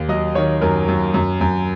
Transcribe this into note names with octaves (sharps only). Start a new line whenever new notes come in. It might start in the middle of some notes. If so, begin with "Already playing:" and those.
Already playing: D#2
F#3 D#5
D#3 C#5
F#2 A#4
F#2
F#2
F#2